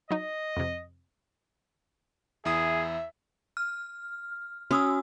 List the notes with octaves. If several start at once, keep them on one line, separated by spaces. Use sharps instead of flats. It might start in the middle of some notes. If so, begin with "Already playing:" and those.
F#3 D#4 D#5
F2 C3
E2 E4 G#4 E5 D#6
F6
C#4 F#4 D#6 E6